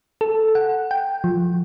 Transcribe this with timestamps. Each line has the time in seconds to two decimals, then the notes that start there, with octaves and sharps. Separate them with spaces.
0.21 A4
0.55 F#5
0.91 G5
1.24 F3